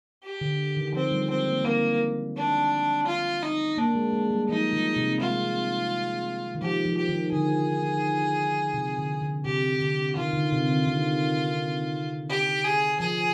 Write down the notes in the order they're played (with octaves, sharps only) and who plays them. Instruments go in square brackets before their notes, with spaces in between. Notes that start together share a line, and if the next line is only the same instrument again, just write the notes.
[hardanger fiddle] G4
[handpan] D3
D#3
[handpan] F3 [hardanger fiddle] C4
[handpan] G3
[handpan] G#3 [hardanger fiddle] C4
[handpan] A#3
[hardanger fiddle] A#3 [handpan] C4
[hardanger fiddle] D4
F4
D#4
[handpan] A#3 [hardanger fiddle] D4
[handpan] G#3
G#3
G3
[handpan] F3 [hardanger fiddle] D#4
[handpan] D#3
C3
[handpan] G#3 [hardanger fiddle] F4
[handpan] D#3
[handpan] F3 [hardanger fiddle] G4
[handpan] F3
[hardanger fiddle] G4
[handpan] D#3
[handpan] D3 [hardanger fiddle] G#4
[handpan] C3
D3
D3
[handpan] C3 [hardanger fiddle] G4
[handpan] D3
[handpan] D#3 [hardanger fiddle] F4
[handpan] D3
C3
D3
D#3
[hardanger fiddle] G4
G#4
[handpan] F3 [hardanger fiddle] G#4